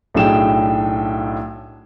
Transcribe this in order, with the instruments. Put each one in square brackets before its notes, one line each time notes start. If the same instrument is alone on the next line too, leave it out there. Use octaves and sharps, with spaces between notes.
[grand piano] B1 A2 D4 G#4 G5 E7